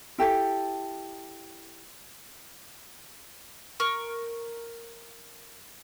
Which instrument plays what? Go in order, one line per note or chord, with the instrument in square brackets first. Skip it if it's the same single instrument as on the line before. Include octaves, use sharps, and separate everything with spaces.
[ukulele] E4 G4 A4
[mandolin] A#4 C#6 F6